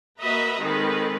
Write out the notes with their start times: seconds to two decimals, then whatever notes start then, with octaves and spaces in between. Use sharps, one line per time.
0.20 A#3 F#4 B4 D#5 E5 A#5
0.59 D#3 G#3 C4 A4 B4